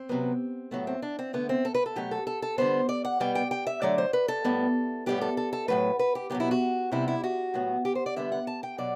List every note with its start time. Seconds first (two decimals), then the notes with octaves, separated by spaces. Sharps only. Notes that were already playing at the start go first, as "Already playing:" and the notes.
Already playing: C4
0.09 C3 F#3 B3
0.71 A2 F#3 A3 B3
0.87 C4
1.02 D4
1.19 C4
1.33 D3 A3 B3
1.49 C4
1.65 A4
1.74 B4
1.86 A4
1.96 B2 F#3 A3 G4
2.11 A4
2.27 A4
2.42 A4
2.58 D3 G3 B3 C5
2.89 D5
3.05 F#5
3.20 B2 G3 B3 G5
3.35 G5
3.51 G5
3.67 E5
3.82 D3 F#3 A3 D5
3.98 C5
4.13 B4
4.28 A4
4.45 A2 G3 B3
5.06 A2 G3 B3 G4
5.21 A4
5.37 A4
5.53 A4
5.68 A2 F#3 A3 B4
5.99 B4
6.15 G4
6.30 B2 F#3 B3 G4
6.40 E4
6.51 F#4
6.92 C3 G3 B3 E4
7.08 E4
7.24 F#4
7.54 A2 F#3 B3
7.85 G4
7.95 C5
8.06 D5
8.16 D3 G3 B3 E5
8.32 F#5
8.47 A5
8.63 G5
8.78 B2 F#3 D5